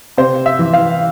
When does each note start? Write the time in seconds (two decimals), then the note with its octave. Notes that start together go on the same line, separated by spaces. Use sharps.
0.18 C3 C5
0.46 E5
0.59 E3
0.73 F5